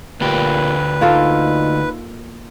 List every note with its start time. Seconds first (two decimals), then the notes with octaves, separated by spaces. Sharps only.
0.21 D2 A#2 G4 B4
1.01 A#3 D#4 F4 A4